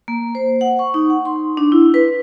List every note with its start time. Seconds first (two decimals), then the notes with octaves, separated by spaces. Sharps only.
0.08 A#3
0.35 C5
0.61 F#5
0.79 C#6
0.94 D#4
1.10 F#5
1.25 C6
1.57 D4
1.72 E4
1.94 B4